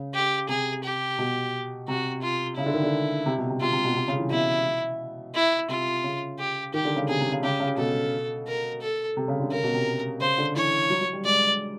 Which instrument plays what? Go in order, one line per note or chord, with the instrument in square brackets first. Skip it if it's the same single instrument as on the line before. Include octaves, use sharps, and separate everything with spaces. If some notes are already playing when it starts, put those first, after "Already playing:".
Already playing: [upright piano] C#3
[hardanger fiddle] G4
[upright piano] C3 [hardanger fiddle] G#4
[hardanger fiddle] G4
[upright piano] B2
[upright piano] C3 [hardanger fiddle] F#4
[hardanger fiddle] F4
[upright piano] C#3 [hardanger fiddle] E4
[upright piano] D3
D#3
D3
C3
B2
C3
[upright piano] C3 [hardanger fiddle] F4
[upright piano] C3
B2
C3
C#3
E3
[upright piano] B2 [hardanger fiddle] E4
[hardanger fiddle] E4
[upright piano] C3 [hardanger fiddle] F4
[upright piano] C#3
[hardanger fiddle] G4
[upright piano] D#3 [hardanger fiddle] G4
[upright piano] D3
C#3
[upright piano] C3 [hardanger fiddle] G#4
[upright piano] C3
C#3
[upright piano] C#3 [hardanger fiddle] G4
[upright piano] C#3
[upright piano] B2 [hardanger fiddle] A4
[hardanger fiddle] A#4
A4
[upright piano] C3
C#3
D3
[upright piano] C#3 [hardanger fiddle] A#4
[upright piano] B2
C3
[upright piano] C#3 [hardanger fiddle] C5
[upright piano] D3
[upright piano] E3 [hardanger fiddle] C#5
[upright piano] F#3
F#3
G3
[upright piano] G#3 [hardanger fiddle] D5